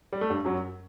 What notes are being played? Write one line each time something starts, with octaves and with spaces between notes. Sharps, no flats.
G3
A3
G2 G3
F#2 F#3